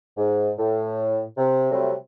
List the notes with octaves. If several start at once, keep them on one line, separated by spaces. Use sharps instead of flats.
G#2
A2
C3
C3 F#3 G3 A3 C4